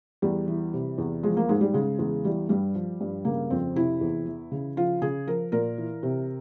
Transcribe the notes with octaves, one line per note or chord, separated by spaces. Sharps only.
E2 G3
E3
C3
E2
F3 G#3
A#3
G#2 G#3
G3
C#3 G#3
E2 G#3
E3 G3
G2 G3
F3
G2
C#3 A#3
F2 C4
C3 E4
E2
E3
C#3
F3 F4
C#3 G#4
F3 A#4
A#2 A#4
E3
C3